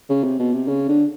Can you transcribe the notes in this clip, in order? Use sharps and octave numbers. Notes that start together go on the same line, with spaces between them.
C#3
C3
B2
C3
C#3
D3